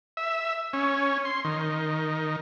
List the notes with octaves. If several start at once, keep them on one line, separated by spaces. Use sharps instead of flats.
E5
C#4
C6
D#3